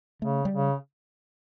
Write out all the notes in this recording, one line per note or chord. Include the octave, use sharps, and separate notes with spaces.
C#3 A3
G3
C#3